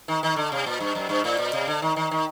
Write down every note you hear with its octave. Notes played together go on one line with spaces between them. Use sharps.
D#3
D#3
D3
C3
A#2
G2
F#2
G2
A2
A#2
C3
D3
D#3
D#3
D#3